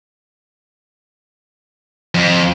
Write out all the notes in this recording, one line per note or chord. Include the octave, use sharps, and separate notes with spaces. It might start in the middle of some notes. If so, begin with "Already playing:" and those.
F2